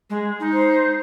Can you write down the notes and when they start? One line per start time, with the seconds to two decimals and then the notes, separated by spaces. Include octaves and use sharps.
0.10 G#3
0.40 D#4
0.53 C5